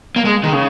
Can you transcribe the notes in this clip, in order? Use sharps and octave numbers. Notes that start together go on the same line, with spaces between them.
A#3
G#3
D#3
C#3